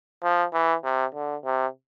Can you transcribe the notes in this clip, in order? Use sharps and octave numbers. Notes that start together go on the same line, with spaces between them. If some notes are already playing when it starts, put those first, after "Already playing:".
F3
E3
C3
D3
C3